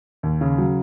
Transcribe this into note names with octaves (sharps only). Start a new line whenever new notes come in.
D#2
C#3
F#3